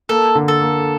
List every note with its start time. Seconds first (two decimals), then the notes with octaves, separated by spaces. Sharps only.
0.09 A#3 A4
0.35 D3
0.48 A4
0.61 A#3